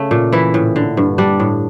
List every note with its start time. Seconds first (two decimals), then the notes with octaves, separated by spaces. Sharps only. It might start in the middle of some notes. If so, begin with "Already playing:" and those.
Already playing: C#3 A3
0.11 A#2
0.33 E3 E4
0.54 A2
0.76 D3
0.97 G2
1.18 G3 D4
1.40 A2